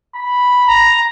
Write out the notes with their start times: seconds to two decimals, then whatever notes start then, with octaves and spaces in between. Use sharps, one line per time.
0.16 B5
0.67 A#5